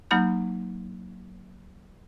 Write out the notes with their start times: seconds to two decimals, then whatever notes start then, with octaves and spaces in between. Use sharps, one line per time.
0.11 F#3 A#3 D#4 B5 F6 G6